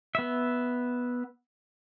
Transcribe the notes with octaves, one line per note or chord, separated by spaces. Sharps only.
B3 E5